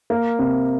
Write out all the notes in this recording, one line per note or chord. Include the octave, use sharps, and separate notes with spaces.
A#3
C3